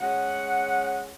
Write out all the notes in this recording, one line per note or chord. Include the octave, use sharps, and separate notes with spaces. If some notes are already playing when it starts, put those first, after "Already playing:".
G#3 C#4 F#5